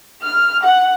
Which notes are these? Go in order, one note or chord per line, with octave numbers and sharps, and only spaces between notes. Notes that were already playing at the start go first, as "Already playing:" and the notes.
F6
F#5